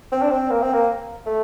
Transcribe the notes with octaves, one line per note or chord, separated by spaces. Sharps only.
C4
D4
C4
A#3
C4
A#3
A3